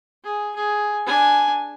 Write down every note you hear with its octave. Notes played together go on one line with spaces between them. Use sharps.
G#4
G#4
D4 G#5